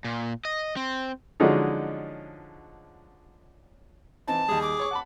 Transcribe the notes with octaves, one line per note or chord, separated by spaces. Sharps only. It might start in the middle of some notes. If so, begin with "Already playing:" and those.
A#2
D#5
C4
D3 F3 F#3 G#3 C#4 D#4
E3 C4 D#4 A5
D#2 G3 G#4
D6
C#5 C#6
F#5 A5 B5